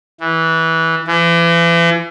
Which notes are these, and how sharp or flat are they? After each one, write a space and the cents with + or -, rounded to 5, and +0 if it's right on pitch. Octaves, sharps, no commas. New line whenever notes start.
E3 -15
E3 +40